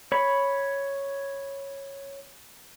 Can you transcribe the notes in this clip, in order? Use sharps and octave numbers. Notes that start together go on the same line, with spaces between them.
C#5 B5